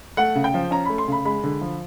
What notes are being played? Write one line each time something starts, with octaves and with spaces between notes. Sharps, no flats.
A3 F#5
C#3
G5
F3
C#4 A#5
A3 B5
C6
C#3 B5
G#3 B5
D3
F3